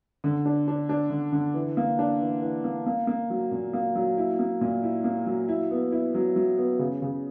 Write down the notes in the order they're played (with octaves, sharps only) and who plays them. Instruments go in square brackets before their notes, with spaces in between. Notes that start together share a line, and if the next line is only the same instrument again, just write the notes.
[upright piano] D3
D4
D4
D4
D3
D3
E3
A#3
D4
E3
E3
A#3
A#3
A#3
F#3
A#2
A#3
F#3
E4
A#3
A#2
E4
A#3
F#3
E4
B3
E4
F#3
F#3
B3
C#3
C#3